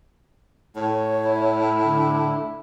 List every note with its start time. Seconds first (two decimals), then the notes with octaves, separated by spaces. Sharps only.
0.76 A2 C#5
1.25 E4
1.83 D3